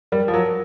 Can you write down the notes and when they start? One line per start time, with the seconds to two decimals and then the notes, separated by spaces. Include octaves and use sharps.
0.12 G3 A#4
0.28 F3
0.33 F#3 A#4